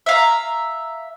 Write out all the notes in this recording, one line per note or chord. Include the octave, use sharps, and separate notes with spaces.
E5 F5 A#5